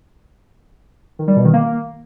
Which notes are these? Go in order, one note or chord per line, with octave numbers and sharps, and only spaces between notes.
D#3
G3
B2
D#3
A#3